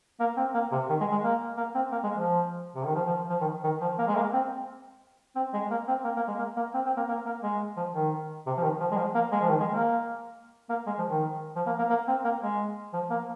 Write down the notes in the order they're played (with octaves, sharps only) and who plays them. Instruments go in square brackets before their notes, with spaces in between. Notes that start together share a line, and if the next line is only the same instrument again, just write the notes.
[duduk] A#3
C4
A#3
C3
D#3
G#3
G#3
A#3
A#3
C4
A#3
G#3
F3
C3
D#3
F3
F3
F3
D#3
D#3
F3
A#3
G#3
A#3
C4
C4
G#3
A#3
C4
A#3
A#3
G#3
A#3
A#3
C4
C4
A#3
A#3
A#3
G#3
F3
D#3
C3
F3
D#3
F3
G#3
F3
A#3
G#3
F3
D#3
G#3
A#3
A#3
G#3
F3
D#3
F3
A#3
A#3
A#3
C4
A#3
G#3
F3
A#3